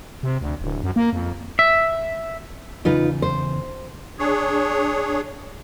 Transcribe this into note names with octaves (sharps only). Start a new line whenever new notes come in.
C3
D2
D1
F#2
A#3
F2
E5
E2 C#3 D#4 F4 B4
C5
D4 G#4 C#5